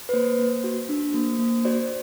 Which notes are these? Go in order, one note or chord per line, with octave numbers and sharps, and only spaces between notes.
B4
A#3 C5
A#3
F#4
D4
A#3
A#3
F#4 C5 D5